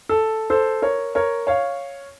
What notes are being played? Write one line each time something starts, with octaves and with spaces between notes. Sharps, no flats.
A4
A4 C5
A#4 C#5
A#4 C#5
C#5 F5